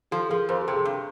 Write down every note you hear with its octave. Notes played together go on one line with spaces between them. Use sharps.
F3 G4 A4
F3 G#4 A#4
F2 A#4 C5
G4 A4
C3
G#4 A#4
G2